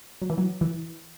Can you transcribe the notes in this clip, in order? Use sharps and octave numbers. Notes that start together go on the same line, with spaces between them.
F#3
E3
F#3
E3